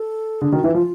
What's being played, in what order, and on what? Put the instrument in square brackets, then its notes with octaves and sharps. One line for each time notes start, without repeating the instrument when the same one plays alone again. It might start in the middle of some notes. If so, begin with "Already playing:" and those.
Already playing: [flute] A4
[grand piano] D3 [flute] G#4
[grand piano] D#3 [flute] F#4
[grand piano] E3 [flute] F4
[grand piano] F3 [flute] F4